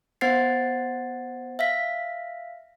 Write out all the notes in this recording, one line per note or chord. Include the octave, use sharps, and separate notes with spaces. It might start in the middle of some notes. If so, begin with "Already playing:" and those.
B3 C5 F#5 G#6 A6 C7
E5 F5 B6